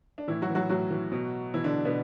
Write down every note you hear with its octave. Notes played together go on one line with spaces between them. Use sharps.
D4
A2 E3 E4
F#3 F#4
E3
F#3 F#4
A2 F#3 F#4
E3
B2
B2 E3 E4
D3 D4
B2 B3